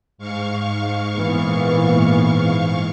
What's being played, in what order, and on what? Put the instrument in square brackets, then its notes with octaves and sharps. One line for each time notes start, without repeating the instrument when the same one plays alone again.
[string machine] G#2 F5 C#6
[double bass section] A#2 E3 B3